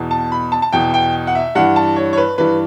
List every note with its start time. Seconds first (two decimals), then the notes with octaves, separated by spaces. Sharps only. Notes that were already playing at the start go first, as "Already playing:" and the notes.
Already playing: E2 B2
0.11 A5
0.32 B5
0.52 A5
0.62 A5
0.73 E2 B2 G5
0.94 G5
1.27 F#5
1.35 E5
1.55 G2 E3 F#5
1.76 A5
1.96 C#5
2.13 C#5
2.18 B4
2.38 G2 E3 B4